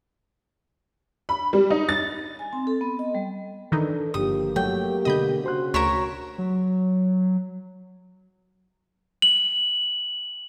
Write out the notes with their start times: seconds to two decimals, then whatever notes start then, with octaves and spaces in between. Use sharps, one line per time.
1.29 B5
1.53 G3
1.70 D#4
1.89 A6
2.39 G#5
2.53 C4
2.67 A4
2.81 B3
2.99 D#5
3.15 G3
3.72 D#3 E3 D4 D#4 A4
4.14 G1 F3 A#3 G4 D#6
4.56 F#3 A3 C#5 G5
5.05 B2 D3 A3 D#5 B5 G6
5.44 C#3 F#4 C5 C6 F#6
5.74 D2 A#4 C#5 B6 E7
6.38 F#3
9.22 F#7